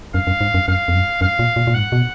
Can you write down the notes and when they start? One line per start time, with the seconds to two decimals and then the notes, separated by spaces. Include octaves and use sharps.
0.14 F#2 F5
0.27 F#2
0.41 G#2
0.54 F#2
0.68 F#2 F5
0.88 F2
0.94 F#2
1.21 F#2 F5
1.39 A#2
1.56 A#2
1.67 A#2
1.74 G#2 F#5
1.92 B2